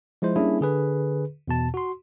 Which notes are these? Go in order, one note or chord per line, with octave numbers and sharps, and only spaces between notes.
F3 G#3 E4 C5
G3 A#3 C#4 D4 E4 G#4
D3 G#4 B4
E2 B2 A5
F#4 C6